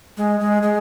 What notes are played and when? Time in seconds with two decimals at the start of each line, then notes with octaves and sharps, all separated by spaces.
0.17 G#3
0.40 G#3
0.62 G#3